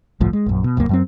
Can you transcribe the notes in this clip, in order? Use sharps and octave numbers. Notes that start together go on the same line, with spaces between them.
G1 C2 A2 F3
G#3
A#1 F#2
B2
D#1 C2 F#2 A#3
F#2 F#3 C4